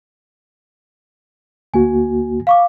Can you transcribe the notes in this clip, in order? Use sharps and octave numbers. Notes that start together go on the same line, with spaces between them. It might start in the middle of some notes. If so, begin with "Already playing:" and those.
D2 A#3 F#4 G#5
F5 C#6 D6